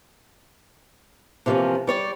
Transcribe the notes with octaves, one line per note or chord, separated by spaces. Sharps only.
C3 E3 F3 A#3 C#4
G3 C#5 D5